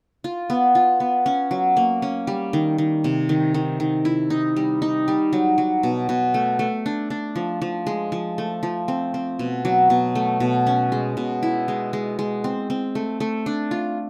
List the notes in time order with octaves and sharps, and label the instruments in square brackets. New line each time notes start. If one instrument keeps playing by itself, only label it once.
[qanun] F4
B3
F4
B3
C#4
F#3
A#3
C#4
G3
D#3
D#3
C3
D#3
D#3
D#3
E4
D#4
G3
D#4
G3
F#3
F#3
B2
B2
A3
A3
D4
D4
F3
F3
G#3
F3
A3
F3
C4
C4
B2
F#3
B2
A3
B2
C#4
G#3
B2
E4
G#3
G#3
G#3
C4
C4
A3
A3
D4
F4